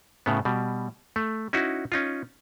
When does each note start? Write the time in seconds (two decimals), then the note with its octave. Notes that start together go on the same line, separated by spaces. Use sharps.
0.26 A2 C#3 B3
0.45 B2 G3
1.16 A3
1.53 C#4 D#4 E4 F#4
1.92 C#4 D#4 F4